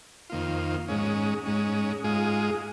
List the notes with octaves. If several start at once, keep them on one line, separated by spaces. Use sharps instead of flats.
F2 D#3 A#3 F4
G#2 G#3 C#4
G#2 G#3 C#4
G#2 G#3 F4 G#4